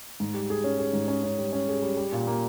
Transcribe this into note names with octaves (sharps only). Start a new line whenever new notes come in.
G#2
G3
G#4
C#4
G#4
G#2
C#4
C#4
G3
C#4
G#4
G3
G3
A#2
A#3